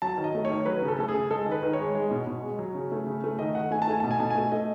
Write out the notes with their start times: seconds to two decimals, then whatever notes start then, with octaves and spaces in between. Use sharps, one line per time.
0.02 F#3 A5
0.18 D#3
0.24 D#5
0.35 A3
0.45 C#5
0.50 D#3
0.66 F#3 B4
0.82 C#3
0.88 A4
0.99 A3 A4
1.08 G#4
1.15 C#3
1.31 G#3 A4
1.46 D#3
1.52 B4
1.63 D#3
1.73 C#5
1.79 G#3
1.95 G#3
2.11 B2
2.27 B2
2.42 G#3
2.59 F#3
2.75 C#3
2.92 A3
3.07 C#3
3.24 A3
3.39 D#3 D#5
3.55 D#3 F#5
3.71 A3 G#5
3.82 A5
3.88 A3 G#5
4.00 B2 A5
4.11 G#5
4.19 B2 A5
4.30 A3 G#5
4.52 A3 D#5